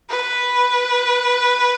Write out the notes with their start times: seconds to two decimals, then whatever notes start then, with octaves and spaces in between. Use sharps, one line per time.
0.10 B4